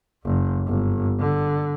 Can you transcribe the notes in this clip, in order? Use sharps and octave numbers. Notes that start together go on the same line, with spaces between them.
F#1
G1
D3